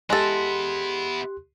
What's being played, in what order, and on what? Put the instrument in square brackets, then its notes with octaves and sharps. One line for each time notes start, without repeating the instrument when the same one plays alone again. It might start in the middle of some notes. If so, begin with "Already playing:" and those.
[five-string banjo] G#3 A4 [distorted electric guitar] B3 E4 [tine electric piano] G4 C6 F#6